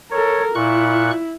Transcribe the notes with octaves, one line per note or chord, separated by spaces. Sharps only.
A4 A#4 C#5
A#2 E4 C#6 F#6